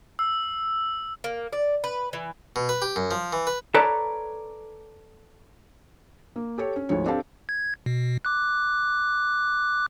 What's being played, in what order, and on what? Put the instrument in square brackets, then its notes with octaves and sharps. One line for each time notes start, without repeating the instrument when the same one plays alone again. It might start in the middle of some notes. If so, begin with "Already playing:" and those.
[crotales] E6
[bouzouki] A#3
D5
B4
E3
[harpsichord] B2
B4
G4
F#2
F3
E3
B4
[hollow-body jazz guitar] A4 B4 C#5 D5 A5 A#5
[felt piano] A#3
G4 A4 C#5
C#4
D2 G#2 F3 C#5
C4 D4 G4 A4 F5 A5
[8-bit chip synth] G#6
B2
D6 F#6